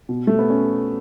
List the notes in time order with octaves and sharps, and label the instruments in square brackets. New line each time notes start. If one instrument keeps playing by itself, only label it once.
[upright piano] B2
A3
B3
C#4